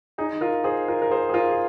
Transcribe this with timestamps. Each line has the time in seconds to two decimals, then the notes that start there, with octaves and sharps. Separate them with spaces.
0.18 D#4 G#4
0.41 F4 A#4
0.64 G#4 C5
0.88 F4 A#4
1.02 A#4
1.11 G#4 C5
1.29 G#4
1.34 F4 A#4
1.49 G#4